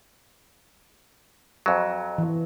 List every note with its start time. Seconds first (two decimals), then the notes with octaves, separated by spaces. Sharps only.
1.66 F2 F#3
2.18 E3